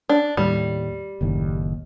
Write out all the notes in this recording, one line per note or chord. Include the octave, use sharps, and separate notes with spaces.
D4
D#2 A2 G3
F#1 D#2 A2